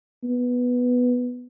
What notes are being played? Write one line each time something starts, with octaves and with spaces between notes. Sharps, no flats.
B3